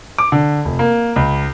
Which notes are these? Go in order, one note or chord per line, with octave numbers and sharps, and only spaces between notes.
D6
D3
F1
A#3
C#2